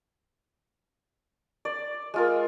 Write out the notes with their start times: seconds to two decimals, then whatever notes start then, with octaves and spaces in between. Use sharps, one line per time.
1.65 D5
2.14 G#3 F4 A#4